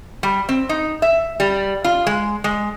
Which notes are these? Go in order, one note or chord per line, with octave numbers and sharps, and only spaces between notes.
G3
C4
D#4
E5
G3
F4
G#3
G#3